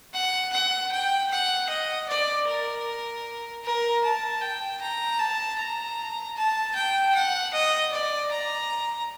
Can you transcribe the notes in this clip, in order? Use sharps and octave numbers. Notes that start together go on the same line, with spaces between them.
F#5
F#5
G5
F#5
D#5
D5
A#4
A#4
A5
G5
A#5
A5
A#5
A5
G5
F#5
D#5
D5
A#5